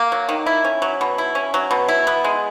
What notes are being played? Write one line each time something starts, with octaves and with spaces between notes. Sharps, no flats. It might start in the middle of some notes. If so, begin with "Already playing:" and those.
Already playing: A#3
F#3
D#3
E4
C#4
F#3
B2
E4
C#4
F#3
B2
E4
B3
G#3